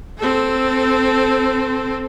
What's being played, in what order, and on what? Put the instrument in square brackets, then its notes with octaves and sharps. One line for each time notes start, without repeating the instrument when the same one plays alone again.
[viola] C4 A4